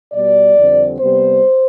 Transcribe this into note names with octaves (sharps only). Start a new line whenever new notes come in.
B2 G3 B3 D5
F2 D3 G3 C4
C3 G3 B3 C5